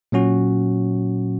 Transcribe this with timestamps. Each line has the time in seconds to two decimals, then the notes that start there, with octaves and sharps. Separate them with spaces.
0.12 A#2 F#3 C#4 F#4